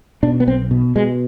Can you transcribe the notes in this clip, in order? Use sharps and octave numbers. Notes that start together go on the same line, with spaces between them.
B2 D4
B3
B1 C4
B2
B2 G#3